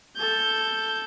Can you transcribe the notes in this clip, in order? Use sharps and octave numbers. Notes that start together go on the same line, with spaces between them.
A4 G6